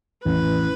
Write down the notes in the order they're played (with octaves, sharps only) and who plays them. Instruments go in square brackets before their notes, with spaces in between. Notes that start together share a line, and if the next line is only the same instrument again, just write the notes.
[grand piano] A1 [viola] B4